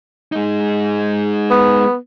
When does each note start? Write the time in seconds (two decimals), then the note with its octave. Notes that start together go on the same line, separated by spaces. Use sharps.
0.32 G#3 D#4
1.51 B3